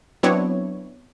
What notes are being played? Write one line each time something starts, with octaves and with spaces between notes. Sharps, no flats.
F#3 B3 C4 D4 E4 C#5